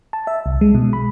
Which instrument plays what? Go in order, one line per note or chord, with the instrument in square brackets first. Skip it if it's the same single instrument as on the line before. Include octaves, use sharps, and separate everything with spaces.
[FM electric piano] A5
E5
C2
G#3
B2
B5